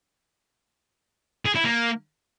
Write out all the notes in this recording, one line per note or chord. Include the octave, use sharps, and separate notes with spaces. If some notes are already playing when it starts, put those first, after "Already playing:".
G#4
E4
A#3